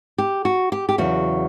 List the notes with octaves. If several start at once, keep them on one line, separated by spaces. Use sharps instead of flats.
G4
F#4
G4
G4
E2 C#3 F#3 F#4